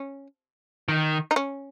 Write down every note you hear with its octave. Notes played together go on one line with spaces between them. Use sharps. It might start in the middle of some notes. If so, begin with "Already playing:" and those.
Already playing: C#4
D#3
D#4
C#4